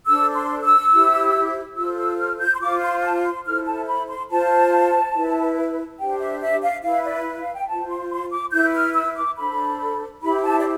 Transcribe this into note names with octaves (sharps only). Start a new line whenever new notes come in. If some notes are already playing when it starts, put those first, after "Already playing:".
D4 A4 C5 E6
C6
E6
E4 G4 C5
F4 A4 C5 E6
E6
F6
G6
C6
F4 C5 D6
C6
A5
C6
E4 A4 C5 F6
A5
B5
C6
F4 C5 A5
E4 B4
D4 G4 C5 G5
E5
E5
F5
E4 B4 F5
D5
F5
G5
F4 C5 A5
C6
C6
D6
E4 B4 G6
F6
E6
D6
D4 A4 C5 B5
E4 G4 C5 B5
A5
D5